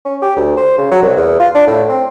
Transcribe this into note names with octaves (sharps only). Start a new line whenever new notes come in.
C#4
G4
D2
C5
C#3
F#3
C2
E2
F4
D4
A2
C4